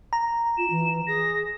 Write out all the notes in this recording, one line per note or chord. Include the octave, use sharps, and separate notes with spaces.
A#5
F4 E7
E3
G#4 A#6